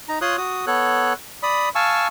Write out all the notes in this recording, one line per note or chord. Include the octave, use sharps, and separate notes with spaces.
D#4 A#5
F4 C#5 C6 D#6 F#6
F#4 D#6
B3 A4 C#5 F#6
D5 B5 D#6
F5 G#5 A5 C#6 E6